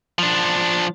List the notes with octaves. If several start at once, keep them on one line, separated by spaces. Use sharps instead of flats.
F3 D4